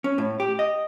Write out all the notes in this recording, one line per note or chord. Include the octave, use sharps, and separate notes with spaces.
C#4
A2
G4
D#5